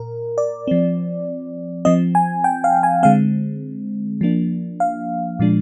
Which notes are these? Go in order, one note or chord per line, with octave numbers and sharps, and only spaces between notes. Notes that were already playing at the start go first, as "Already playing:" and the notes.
Already playing: A#2 A#4
D5
F3 C4
F3 C4 D#5
G#5
G5
F5
G#5
D3 G#3 C4 F5
F3 A#3 D4
F5
A#2 F3 G#3 D4